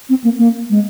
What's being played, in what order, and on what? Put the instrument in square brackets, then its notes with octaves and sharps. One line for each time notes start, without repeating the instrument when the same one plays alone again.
[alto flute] C4
A#3
A#3
G#3